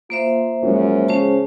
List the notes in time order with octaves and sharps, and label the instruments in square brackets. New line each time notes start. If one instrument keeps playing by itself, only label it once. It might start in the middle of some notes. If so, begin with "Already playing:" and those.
[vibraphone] A#3 C5 E5 [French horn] F4
[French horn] F#2 [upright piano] F3 G#3 F4
[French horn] C#3 [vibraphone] C#4 C5 A5